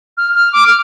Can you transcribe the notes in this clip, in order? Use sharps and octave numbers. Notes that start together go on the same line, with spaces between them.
F6
F6
D6
F6